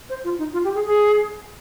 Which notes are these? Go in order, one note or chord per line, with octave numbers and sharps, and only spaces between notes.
C5
F4
D#4
F4
G4
G#4
G#4